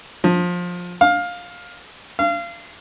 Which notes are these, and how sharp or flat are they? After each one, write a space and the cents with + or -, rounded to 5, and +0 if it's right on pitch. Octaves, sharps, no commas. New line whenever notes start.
F3 +20
F5 +15
F5 -30